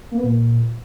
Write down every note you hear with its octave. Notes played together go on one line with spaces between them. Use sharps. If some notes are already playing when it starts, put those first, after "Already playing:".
A#3
B3
A#2